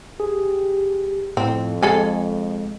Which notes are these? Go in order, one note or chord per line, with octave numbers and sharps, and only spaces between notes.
G4 G#4
F2 A2 C4
G#3 G#4 A4 G#5